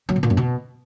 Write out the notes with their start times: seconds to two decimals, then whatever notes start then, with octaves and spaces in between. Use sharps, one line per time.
0.09 F#3
0.16 B2
0.23 A#2
0.30 F#2
0.37 B2